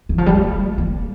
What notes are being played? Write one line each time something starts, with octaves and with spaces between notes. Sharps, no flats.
E3
F3
G3
A3
A#3